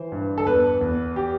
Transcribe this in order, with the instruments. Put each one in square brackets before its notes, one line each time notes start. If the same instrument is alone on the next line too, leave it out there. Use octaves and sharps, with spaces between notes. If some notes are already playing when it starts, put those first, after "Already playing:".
Already playing: [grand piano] E3 C5
G2
A4
E2 B4
E2
G4